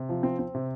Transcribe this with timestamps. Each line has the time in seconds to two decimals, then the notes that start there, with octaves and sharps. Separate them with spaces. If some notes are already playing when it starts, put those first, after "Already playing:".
Already playing: C3
0.09 F3
0.23 C4
0.39 C4
0.55 C3